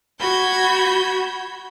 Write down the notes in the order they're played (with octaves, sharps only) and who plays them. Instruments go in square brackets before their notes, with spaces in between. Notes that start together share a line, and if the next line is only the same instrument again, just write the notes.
[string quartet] F#4 B5 G6 G#6